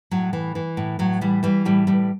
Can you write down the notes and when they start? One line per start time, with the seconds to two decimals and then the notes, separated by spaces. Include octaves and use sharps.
0.11 A2 F#3
0.33 E3
0.55 E3
0.77 A2
0.99 A2 F#3
1.21 E3 G3
1.43 E3 G3
1.65 A2 G3
1.87 A2 G3